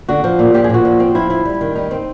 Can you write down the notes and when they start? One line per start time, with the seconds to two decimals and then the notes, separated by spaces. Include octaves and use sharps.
0.09 D3 F#4
0.24 F3
0.39 A#2
0.54 F3 G4
0.64 G#4
0.69 A#2 F#4
0.85 F3
1.00 C4
1.15 F3 E4
1.30 C4 E4
1.45 G3
1.61 D#3
1.75 G3 D#4
1.91 C4